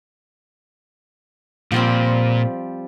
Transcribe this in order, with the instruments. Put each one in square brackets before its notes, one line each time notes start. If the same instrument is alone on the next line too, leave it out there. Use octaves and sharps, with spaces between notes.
[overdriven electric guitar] A#2 [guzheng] F3 G3 C4